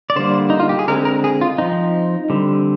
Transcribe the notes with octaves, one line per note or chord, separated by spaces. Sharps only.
D5
D3 G3 A#3 C5
D#4
F4
G4
G#4
D3 G#3 C4 A#4
A#4
G#4
F4
F3 C4 D#4
D3 G3 C4